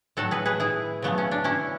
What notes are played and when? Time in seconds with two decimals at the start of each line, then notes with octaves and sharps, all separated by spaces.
0.17 A2 F#3 A3 F#4 A4
0.31 G#4 B4
0.45 G#4 B4
0.60 E4 G#4
1.02 C#3 F#3 A3 B3
1.18 C#4
1.31 D4
1.44 C#4 E4